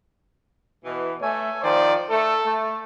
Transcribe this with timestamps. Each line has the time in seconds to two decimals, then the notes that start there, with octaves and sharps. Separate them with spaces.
0.84 B2 E3
1.22 A3 C#5 E5 G#5
1.63 D#3 F3 C5 D5
2.10 A3 A4
2.45 A3